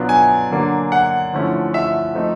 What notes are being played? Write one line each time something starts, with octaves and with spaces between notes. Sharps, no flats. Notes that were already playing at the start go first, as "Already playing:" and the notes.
Already playing: B2 F#3 B3 D4 F4
G#5
D3 F#3 A#3 D4
F#5
D3 F3 A3 C#4 E4
E5
F3 A3 C4 D#4